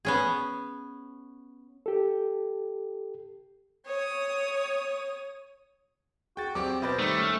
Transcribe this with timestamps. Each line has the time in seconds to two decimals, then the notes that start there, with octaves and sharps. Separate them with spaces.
0.05 B3 C#4 G#4
1.86 G4 A4
3.86 C#5 D#6
6.37 F#4 G#4 G5 A6
6.55 F#3 C4 G4 D5 G5 D6
6.82 B2 B4 C5 B5 G6 A6
6.99 D#3 G3 A3 D#4
7.16 C#4 F6